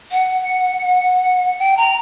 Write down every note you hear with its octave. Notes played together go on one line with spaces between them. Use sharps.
F#5
G5
A#5